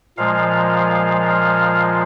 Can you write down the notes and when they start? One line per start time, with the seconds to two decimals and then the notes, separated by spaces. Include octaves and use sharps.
0.17 A#2 F3 G#3 F5
0.74 F5
1.29 F5